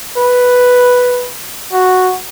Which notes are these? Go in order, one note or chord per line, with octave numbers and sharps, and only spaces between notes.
B4
F#4